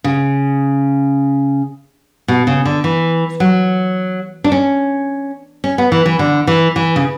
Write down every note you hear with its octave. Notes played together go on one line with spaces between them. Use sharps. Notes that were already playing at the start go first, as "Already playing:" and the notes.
C#3
B2
C#3
D3
E3
F#3
D4
C#4
C#4
B3
E3
E3
D3
E3
E3
C#3